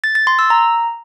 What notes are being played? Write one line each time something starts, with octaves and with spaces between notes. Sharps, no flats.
A6
A6
C6
E6
A#5